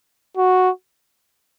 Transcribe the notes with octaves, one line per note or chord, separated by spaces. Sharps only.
F#4